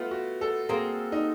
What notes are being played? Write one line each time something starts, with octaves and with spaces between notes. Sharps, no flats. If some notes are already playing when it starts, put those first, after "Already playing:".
Already playing: A3 B3 F4
F#4
A4
A#3 C4 G#4
D#4